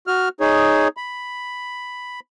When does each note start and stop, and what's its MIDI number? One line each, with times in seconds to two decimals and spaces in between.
0.07 0.29 66
0.07 0.29 89
0.41 0.88 63
0.41 0.88 68
0.41 0.88 73
0.97 2.20 83